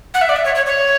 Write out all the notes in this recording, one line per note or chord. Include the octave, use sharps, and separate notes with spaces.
F#5
E5
D5
E5
C#5
C#5
C#5